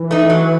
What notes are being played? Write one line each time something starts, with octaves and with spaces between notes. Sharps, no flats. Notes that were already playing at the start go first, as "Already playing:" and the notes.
Already playing: E3
A3 D#4
F#3